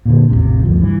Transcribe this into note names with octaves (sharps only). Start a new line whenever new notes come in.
A#2 D3
A1 E2 C3
G1 D2 F3
G2 E3